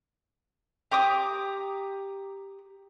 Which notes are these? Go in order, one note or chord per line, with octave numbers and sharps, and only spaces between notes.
G4 A#5 D6 D#6